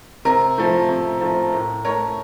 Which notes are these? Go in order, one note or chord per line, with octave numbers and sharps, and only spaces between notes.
C3 A#4
F3 A3
C3
F3 A3
A2 A#4
A3 A#4 C#5